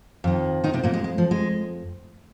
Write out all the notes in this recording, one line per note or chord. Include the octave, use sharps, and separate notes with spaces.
F2 D#3
D#3 D#4
C3 C4
A#2 A#3
G#3
G#3
F3
G#3